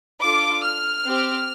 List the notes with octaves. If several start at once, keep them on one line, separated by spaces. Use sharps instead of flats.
D4 F4 A4 D6
F6
C4 G4